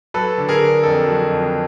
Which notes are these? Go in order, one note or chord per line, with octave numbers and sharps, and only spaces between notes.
F#3 A4 B4
D3
G#4 A#4
D3
F2 A4
F#3
F2